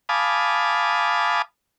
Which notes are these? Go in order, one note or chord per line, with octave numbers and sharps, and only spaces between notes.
F5 G#5 A5 B5 D6 D#6